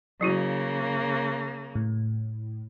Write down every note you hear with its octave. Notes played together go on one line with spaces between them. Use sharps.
C#3 F#3 A#3 E4 F#4
A2